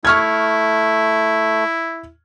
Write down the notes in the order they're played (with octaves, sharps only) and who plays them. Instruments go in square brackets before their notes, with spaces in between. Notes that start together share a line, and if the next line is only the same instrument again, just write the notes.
[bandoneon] A3 [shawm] E4 [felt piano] C#6 F6 G#6